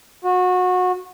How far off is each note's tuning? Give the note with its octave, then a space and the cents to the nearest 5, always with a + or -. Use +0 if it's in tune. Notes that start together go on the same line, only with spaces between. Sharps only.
F#4 -25